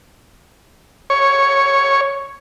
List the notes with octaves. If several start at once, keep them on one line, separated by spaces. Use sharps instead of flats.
C#5